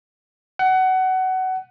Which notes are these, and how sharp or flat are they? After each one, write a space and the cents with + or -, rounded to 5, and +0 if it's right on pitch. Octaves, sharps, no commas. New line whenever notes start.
F#5 +20